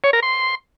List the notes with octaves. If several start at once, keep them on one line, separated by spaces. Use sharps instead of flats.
C#5
A#4
C6